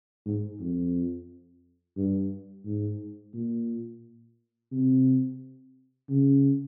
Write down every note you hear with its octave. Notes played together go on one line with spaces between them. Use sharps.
G#2
F2
G2
G#2
A#2
C3
C#3